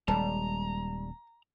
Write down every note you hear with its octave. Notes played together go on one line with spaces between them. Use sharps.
D#1 G3 G#3 A5 A#5